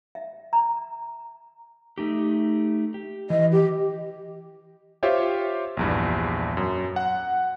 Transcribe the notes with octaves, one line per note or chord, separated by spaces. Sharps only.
E5
A#5
A3 D#4 G4
G4
E3 D#5
G4
F4 G4 C5 C#5 E5
A#1 E2 G2
F#2
F#5